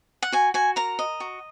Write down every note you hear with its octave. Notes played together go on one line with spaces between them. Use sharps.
F#5
F#4 G#5
F#4 G#5
A#4 A#5
D#5
F#4